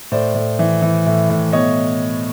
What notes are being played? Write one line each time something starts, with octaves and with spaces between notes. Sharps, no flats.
A2 C5 D5
A2
E3
E3
A2
A2
B2 C#5 D#5